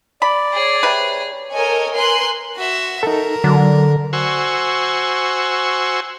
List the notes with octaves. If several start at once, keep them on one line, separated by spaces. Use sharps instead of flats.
D5 B5
G#4 C#5
C3 B4
A4 A#4 C#5 D#5 G#5
A#4 B4 G#5 C6 F#6
F#4 E5
D#4 A4 A#4
D3 F#3
F#4 C5 G#5 C#6 E6